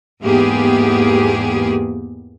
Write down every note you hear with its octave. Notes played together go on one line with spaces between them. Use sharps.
E2 G#2 A#3 B3 G4 G#4